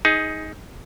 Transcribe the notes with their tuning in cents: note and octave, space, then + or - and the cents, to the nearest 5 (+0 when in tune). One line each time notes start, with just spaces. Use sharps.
D#4 +15 G#4 +0